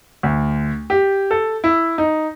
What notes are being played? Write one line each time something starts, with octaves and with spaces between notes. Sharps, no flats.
D2
G4
A4
E4
D#4